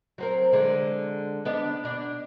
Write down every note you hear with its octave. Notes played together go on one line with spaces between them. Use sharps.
F#3 C4 A#4
D3 G#3
B3 D4 D#5
B2 D4